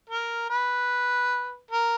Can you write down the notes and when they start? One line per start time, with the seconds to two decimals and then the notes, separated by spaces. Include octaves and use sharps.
0.10 A#4
0.50 B4
1.71 A#4